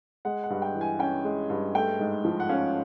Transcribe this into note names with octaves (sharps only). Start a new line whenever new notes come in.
G#3 F#5
F#5
G2
G5
E3
G#5
C#4 G5
G#3
G2
A3 G5
G#2
F3
F#5
C#4 F5